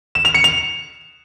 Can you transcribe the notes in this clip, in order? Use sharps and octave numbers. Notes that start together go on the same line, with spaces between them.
E7
F7
C#7
F7